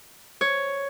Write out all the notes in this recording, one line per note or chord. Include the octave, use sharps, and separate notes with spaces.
C#5